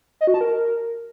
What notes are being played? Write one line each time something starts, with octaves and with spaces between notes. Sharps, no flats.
D#5
F#4
A5
A#4